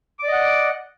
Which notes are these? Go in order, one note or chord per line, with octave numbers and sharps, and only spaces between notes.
D5 D#5 F#5 D6